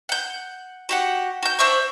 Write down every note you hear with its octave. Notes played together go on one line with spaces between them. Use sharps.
F#5 G6
F#4 G4 F#5
F#4 G6
D4 C5 E5 C#6